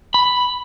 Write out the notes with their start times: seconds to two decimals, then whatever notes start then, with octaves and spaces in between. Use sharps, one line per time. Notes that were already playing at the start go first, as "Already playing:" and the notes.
0.14 B5